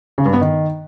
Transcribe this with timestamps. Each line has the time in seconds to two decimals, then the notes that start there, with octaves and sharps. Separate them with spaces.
0.18 C#3
0.26 G2
0.33 B3
0.41 D#3